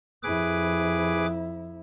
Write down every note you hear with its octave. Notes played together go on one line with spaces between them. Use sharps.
F2 E4 G#4 B4 D6